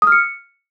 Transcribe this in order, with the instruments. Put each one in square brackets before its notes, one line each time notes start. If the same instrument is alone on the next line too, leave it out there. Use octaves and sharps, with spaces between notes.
[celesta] D#6
F6
C#7